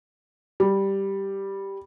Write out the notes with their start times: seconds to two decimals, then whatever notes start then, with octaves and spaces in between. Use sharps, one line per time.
0.60 G3